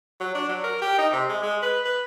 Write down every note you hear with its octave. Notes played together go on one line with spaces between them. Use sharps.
F#3
D4
F#3
A#4
G4
D#4
C3
G#3
G#3
B4
B4